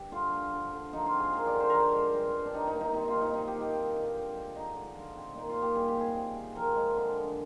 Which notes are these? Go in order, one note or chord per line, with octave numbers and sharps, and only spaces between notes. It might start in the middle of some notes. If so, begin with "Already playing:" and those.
Already playing: G2 G4
D3 F4
F3
D3
D3
F3 D#4
F4
C4
G#4
C4 A#4
D5
D3
C5
F3 A#4
C5
G#3
G2
G2
D4
D#3 D#4
D#4
A#3
D#4
C3 D#4
F4
C3
D#4
D#3 D#4
G4
A#3
G4
C4
D3
F3
G#3
D3 D#4
D3
F3
C4
A#2 D#4
F4
A#2
G4
G3 G#4
G4
C4 G#4
C3
C3
F3 A#4
G#3
D3
D3